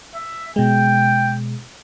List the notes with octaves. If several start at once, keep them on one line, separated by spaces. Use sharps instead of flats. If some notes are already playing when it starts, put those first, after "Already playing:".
E5
B2 G#3 G5